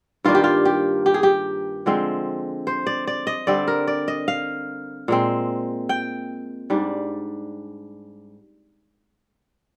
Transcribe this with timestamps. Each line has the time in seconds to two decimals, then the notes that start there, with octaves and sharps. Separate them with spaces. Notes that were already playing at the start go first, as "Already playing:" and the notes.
0.24 G2 D#3 A#3 D4 F4
0.35 G4
0.44 F4
0.65 G4
1.06 G4
1.14 G#4
1.23 G4
1.86 D3 F3 G#3 C4
2.67 C5
2.87 D5
3.07 D5
3.27 D#5
3.47 D3 G3 C4 D5
3.68 A#4
3.87 D5
4.08 D#5
4.28 F5
5.08 A#2 G#3 C4
5.89 G5
6.70 G#2 G3 D4